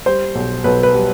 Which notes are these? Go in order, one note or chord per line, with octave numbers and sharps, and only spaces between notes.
G3 C5
B1
B1 B4
B4
G3